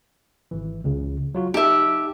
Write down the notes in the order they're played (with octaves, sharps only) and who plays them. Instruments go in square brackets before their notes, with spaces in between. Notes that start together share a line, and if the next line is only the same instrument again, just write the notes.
[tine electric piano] G#1 E3
C#2 C#3
F#3 F4 F#4
[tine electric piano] D#4 A5 [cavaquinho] G4 E5